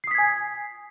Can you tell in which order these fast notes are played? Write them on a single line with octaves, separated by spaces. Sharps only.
C7 D#6 B6 G#6 G#5